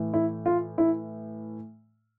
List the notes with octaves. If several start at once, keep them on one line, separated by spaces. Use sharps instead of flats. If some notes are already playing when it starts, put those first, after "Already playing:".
Already playing: A2 E3
E4
F4
E4